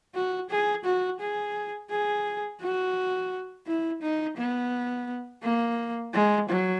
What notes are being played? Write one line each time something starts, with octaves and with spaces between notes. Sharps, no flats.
F#4
G#4
F#4
G#4
G#4
F#4
E4
D#4
B3
A#3
G#3
F#3